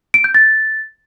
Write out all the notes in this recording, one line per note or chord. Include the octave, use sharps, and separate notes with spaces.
D7
G6
A6